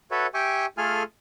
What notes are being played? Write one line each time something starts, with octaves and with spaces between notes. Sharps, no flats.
F#4 A4 B4 C#5 E5
G4 E5 G5 G#5 C#6 D6
A3 F4 G#4 A4 G#5 F6